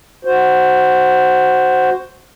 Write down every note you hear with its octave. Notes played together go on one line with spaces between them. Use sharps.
F#4 C5